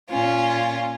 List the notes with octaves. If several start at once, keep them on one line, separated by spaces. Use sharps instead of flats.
A#2 C#4 F4